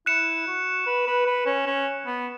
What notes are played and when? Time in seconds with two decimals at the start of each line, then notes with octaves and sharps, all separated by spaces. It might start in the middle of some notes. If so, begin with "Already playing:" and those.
0.06 E4 F#6 C#7 E7
0.47 F#4
0.86 B4
1.07 B4
1.26 B4
1.46 C#4
1.66 C#4
2.06 B3